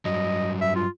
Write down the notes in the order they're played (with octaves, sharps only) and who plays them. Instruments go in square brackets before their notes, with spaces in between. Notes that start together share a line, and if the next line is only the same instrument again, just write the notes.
[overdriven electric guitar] G2 F#3 [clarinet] D#5
[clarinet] E5
F4